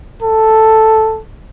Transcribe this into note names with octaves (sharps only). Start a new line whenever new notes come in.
A4